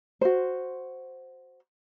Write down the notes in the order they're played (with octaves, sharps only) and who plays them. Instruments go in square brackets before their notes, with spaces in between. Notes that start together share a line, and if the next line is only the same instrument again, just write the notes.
[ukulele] F#4 C5